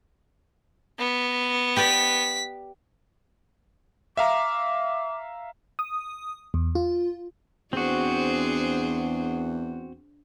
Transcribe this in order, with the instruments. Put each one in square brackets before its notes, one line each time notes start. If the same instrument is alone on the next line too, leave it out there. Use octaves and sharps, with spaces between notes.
[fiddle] B3
[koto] G4 B4 D5 [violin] B6
[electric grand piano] E5 F5 A#5 [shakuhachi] D6
[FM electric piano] D#6
E2
F4
[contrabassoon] E2 [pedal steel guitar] C4 F#4 [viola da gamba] D4 G#4 C5